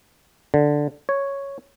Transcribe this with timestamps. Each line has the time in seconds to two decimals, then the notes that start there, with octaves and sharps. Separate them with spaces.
0.54 D3
1.09 C#5